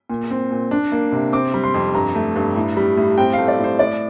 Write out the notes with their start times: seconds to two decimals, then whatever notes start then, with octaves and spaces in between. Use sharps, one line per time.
0.10 A#2
0.30 C4
0.51 A#2
0.71 D4
0.92 A#3
1.12 C3
1.33 C4 D6
1.54 G3
1.64 C6
1.74 F2
1.94 G2 A#5
2.15 A3
2.36 G2
2.56 A2
2.77 G3
2.97 A2
3.18 C4 G5
3.33 A3 F5
3.48 D5
3.59 A2 C5
3.79 A2 D5